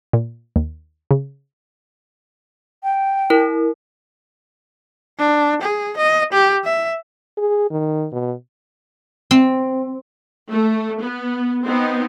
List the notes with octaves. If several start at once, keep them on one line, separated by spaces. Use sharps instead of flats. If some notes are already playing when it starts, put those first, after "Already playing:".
A#2
D#2
C#3
G5
E4 A#4
D4
G#4
D#5
G4
E5
G#4
D#3
B2
C4
A3
B3
B3 C4 D#4